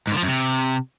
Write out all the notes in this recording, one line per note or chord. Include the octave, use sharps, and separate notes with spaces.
G#2
D3
F3
F#2
C3